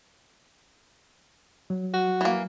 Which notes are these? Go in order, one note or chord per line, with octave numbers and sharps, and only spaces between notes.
F#3
F#4
E3 A#3